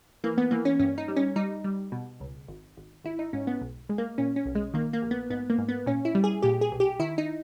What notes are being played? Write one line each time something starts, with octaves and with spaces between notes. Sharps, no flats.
E3 A#3
B3
E3 A#3
C#4
G2 C#4
D#4
G3
C#4
G3 D#4
G3
B2
C#2
G#1
G#1
G#1 E4
D#4
G#2 C#4
B3
B1
G#3
A#3
A#2 C#4
C#4
B1
G#3
D#3 A#3
A#3
A#1
B3
G#2 B3
A#3
G#2
B3
A#2 C#4
E4
G3
G#4
A#2 G4
G#4
B1
G4
D#3 E4
D#4